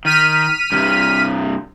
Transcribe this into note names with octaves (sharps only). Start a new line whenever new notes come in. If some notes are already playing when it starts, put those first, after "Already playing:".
D#3 F6 B6 D#7
G2 C3